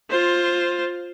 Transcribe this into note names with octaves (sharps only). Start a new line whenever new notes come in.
F4 C5